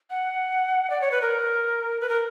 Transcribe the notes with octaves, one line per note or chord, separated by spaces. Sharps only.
F#5
D5
C#5
B4
A#4
B4
A#4